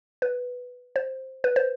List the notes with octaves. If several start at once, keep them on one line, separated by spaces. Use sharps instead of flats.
B4
C5
B4
C5